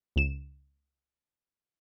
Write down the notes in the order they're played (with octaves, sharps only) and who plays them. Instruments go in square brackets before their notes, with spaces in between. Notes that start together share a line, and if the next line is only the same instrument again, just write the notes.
[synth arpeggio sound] C#2 E7